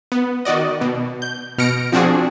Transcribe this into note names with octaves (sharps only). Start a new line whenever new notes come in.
B3
D#3 F#4 D5 D#5
B2
G6
B2 F6 A#6 C#7 D7
F3 C4 D4 F#4 G#4